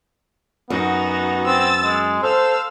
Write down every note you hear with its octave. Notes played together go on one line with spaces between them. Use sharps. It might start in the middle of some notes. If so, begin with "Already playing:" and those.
F#2 B3 D#4 F#4
C4 E6 A6
G#3
A4 C5 F5 E6